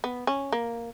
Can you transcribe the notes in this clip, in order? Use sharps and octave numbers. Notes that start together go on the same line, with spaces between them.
B3
C#4
A#3